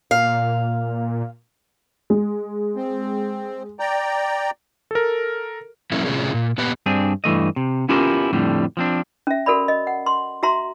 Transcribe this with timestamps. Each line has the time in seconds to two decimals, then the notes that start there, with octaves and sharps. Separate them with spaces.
0.11 A#2 F5
2.10 G#3
2.76 C4
3.79 D5 G5 A#5
4.91 A4 A#4
5.92 F#3 A3 A#3 C4 C#4 E4
6.06 A2 C3 G#3 C#4 F4 G#4
6.34 A#2
6.58 A#2 B3 G4 B4
6.86 G2 C4 D4 G#4
7.24 G2 E3 A3 D#5
7.56 C3
7.89 B3 C#4 E4 F4 G4 A#4
8.33 F2 A2 D3 G3
8.77 F3 C4 D4
9.27 C#4 E5
9.46 F#4 A4 A#4 D5 B5
9.68 D#5
9.87 F#5
10.06 C6
10.43 F#4 E5 A#5 C6